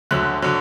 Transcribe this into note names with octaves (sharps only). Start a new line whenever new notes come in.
D2 D3 F#3 F#6
D3 F#3